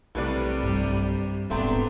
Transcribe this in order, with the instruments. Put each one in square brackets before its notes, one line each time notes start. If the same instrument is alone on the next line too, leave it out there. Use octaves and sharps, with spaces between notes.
[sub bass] B1 [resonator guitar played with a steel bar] A2 B4 D5 [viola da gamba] C3 G3
[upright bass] G2
[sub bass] D#1 [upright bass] A#1 G#2 [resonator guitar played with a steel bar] A3 C4 A#5 [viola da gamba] B3 D4